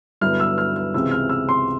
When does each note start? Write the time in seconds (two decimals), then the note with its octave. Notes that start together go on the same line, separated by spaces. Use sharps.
0.21 G2 D3 F#3 B3 E4 F6
0.40 E6
0.58 F6
0.76 F6
0.94 C#2 C3 E3 G#3 C4 E6
1.11 F6
1.29 E6
1.49 C6